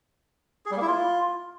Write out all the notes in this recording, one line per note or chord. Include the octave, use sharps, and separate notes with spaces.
G#4
G3
A#3
E4
F4